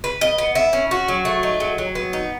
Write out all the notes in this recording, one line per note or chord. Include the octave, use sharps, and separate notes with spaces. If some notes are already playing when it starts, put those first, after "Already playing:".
B4
D#5
B3
E4
C#4
F#4
F#3
A3
D#4
F#3
F#3
B3
D#4